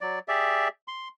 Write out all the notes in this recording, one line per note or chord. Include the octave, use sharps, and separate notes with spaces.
F#3 D5
G4 G#4 D5 E5
C6